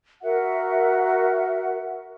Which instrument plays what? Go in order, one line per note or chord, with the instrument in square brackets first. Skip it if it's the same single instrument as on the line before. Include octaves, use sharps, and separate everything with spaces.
[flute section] F#4 A#4 E5 F#5